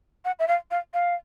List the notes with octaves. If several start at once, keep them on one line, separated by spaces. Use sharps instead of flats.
F#5
E5
F5
F5
F5